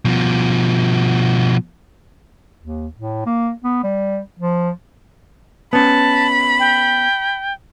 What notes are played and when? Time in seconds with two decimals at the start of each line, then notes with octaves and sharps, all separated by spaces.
0.05 B2 F3
2.61 D#2
2.96 A2
3.26 A#3
3.64 B3
3.84 G3
4.39 F3
5.73 B3 C#4 A5 B5
6.60 G5